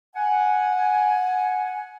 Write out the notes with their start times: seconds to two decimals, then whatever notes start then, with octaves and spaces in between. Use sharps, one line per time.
0.15 F#5 G#5